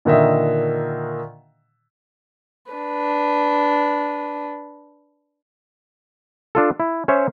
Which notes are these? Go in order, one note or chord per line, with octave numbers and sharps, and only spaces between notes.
A#2 D3 D#3 D#5 E5
D4 B4
D4 F4 A4
E4
C#4 C5 C#5 E5